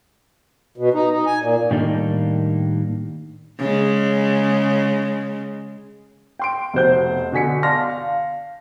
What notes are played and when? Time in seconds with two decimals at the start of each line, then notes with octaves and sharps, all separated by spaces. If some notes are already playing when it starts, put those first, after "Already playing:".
0.78 B2
0.94 D#4
1.10 D#4
1.26 G#5
1.41 A#2
1.71 A2 D#3 G3 A#3 D4 D#4
3.59 C#3 G#3
6.39 G5 C6 D7
6.73 F1 B2 C5 G6
7.32 B2 D3 G#5 B6 C#7
7.63 D5 F5 A5 C6 F6 A#6
7.89 F5